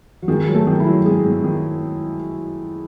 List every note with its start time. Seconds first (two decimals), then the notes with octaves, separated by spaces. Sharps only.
0.22 F#3
0.28 D#3 G#3
0.48 F#3
0.54 A3
0.67 D#3
0.80 E4
0.86 F#3
1.05 G#2 G#4
1.26 G#2
1.44 D#3